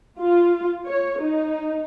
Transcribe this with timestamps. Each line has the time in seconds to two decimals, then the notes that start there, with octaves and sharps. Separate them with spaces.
0.19 F4
0.86 C#5
1.21 D#4